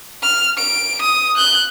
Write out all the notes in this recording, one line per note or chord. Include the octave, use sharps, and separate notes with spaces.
F6
D7
D#6
F#6 G6